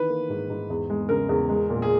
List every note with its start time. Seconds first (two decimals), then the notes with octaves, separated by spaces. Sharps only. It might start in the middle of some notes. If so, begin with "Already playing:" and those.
Already playing: D#3 E3 B4
0.09 A#3
0.30 G#2
0.50 G#2
0.70 E2
0.90 G#3
1.09 C#3 A#4
1.29 E2
1.49 G#3
1.70 A#2
1.82 G#4